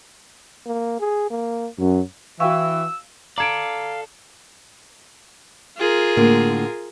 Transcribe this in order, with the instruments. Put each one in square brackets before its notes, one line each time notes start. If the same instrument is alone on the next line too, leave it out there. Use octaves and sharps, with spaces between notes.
[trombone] A#3
G#4
A#3
[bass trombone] F#2 [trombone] F#3
[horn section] E3 [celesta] F#4 G5 C#6 [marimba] F5 [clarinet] E6
[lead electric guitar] A4 D5 [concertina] F5 [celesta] A#5 G#6 D7
[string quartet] F4 G#4 A#4
[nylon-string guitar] A2 D3 A#3